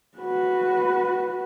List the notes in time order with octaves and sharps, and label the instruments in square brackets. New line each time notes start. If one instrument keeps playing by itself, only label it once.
[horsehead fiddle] F#4 B4